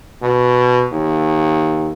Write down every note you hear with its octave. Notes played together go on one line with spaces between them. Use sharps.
B2
D#2